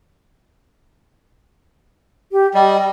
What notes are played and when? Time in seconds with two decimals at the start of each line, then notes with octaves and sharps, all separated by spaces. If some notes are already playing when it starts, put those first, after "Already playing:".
2.32 G4
2.54 G3 D#5